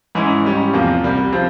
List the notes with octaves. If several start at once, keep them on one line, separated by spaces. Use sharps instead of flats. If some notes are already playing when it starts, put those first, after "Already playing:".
G#2 E3 G#3 C#4 E4
G#2 G3 C#4 G4
E2 C3 F3 A#3
C2 C3 G3
F3 C4